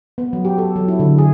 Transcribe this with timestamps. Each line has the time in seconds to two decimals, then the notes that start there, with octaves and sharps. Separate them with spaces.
0.18 B3
0.33 F#3
0.45 G4
0.58 A4
0.76 F#3
0.88 E4
1.00 D3
1.18 G#4